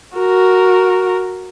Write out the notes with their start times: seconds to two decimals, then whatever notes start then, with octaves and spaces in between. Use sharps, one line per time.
0.16 F#4 A#4